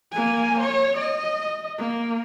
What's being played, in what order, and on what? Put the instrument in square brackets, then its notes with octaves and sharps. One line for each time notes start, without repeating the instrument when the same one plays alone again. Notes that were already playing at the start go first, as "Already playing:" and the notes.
[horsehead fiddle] A#3 G#5
C#5
D#5
A#3